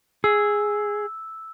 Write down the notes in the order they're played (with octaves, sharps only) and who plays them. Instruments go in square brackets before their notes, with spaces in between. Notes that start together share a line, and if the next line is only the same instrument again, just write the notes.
[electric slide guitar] G#4 [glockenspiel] E6